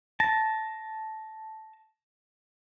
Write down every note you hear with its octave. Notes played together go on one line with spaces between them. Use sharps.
A5 A#6